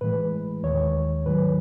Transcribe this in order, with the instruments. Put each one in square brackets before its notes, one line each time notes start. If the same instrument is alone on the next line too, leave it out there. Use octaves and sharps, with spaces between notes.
[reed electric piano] A2 E3 G#3 B4
D#2 D#3 G#3 C#5
G#2 D#3 F#3 B4